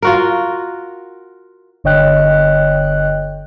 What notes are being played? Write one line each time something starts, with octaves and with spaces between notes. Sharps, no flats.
F4 F#4 A#4
G1 D3 C#5 D#5 G5 F#6